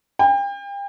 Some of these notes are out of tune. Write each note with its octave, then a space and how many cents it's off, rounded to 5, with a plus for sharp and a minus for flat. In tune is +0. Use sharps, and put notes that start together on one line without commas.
G5 +35